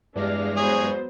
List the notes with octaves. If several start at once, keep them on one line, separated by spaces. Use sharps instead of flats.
E2 G2 G#3 D4 G4 F5 A#6
F#3 B3 G#4 C5 C#5